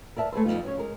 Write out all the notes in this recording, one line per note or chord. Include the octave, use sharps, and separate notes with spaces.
A#4 D5 E5 A5
A3 G#4 B4 C5
F2 D#3 G3 B3 D#4 F4
F#3 C#4 C#5
G#3 G#4 A#4